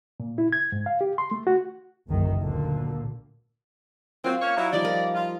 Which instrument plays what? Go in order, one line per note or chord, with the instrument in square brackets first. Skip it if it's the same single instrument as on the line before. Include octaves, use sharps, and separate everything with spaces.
[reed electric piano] A#2
E4
G#6
G#2
F5
G4
C6
A3
F#4
[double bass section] F#1 B1 F#2 D#3
D2 A#2 D3
[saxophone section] F#3 A#3 C4 [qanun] F4
[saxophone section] A#3 C#4 C#5
F#3 D#4 E4
[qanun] F3 G3 D#4 [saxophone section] D5
[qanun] A#4
[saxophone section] F4